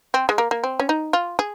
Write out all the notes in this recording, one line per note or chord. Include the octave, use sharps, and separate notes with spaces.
C4
G#3
A#3
A#3
C4
C#4
D#4
F4
G#4